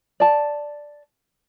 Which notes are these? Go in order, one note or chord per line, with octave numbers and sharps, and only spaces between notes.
D5 A5